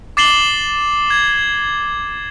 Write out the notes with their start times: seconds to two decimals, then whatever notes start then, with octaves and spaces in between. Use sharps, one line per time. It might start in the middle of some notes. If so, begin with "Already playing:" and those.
0.17 D6 A6 C7 E7 F#7 G7
1.10 G#6